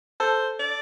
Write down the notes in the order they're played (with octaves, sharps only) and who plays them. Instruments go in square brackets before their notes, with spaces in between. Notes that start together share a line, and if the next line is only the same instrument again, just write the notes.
[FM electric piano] A4 [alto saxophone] C5
[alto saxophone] D5